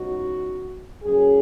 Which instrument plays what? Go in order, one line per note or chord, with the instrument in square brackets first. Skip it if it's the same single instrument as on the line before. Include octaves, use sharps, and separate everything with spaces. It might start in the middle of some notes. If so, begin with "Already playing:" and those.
Already playing: [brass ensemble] C#2 B2 F#3 B3 D#4 F#4
F#1 F#2 C#3 F#3 C#4 G#4